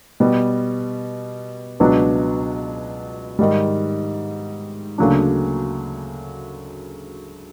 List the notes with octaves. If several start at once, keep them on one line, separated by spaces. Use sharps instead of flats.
B2 G3 B3
C#2 B2 F#3 B3 D4
G#2 D#3 G3
D2 C#3 F#3 A#3 D4